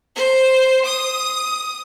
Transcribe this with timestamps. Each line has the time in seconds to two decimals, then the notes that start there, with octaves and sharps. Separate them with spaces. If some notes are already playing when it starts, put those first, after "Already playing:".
0.16 C5
0.86 D#6